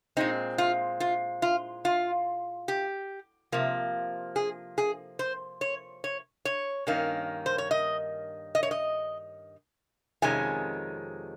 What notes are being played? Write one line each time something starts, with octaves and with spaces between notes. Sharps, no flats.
A#2 G#3 C4 D#4
F4
F4
F4
F4
G4
C3 F3 A#3
G#4
G#4
C5
C#5
C#5
C#5
G2 D#3 A#3 C#4
C5
C#5
D#5
D#5
C#5
D#5
F2 C3 D#3 G#3 C#4 G#5